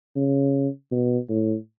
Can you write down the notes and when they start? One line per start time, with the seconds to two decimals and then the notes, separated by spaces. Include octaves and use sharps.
0.16 C#3
0.92 B2
1.29 A2